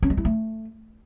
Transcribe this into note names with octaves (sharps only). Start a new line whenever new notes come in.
C#4
G#3
E4
A3